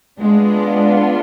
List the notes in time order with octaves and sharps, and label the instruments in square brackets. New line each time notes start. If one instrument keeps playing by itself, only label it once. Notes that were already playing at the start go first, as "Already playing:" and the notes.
[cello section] G#3 [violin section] B3 D4 F4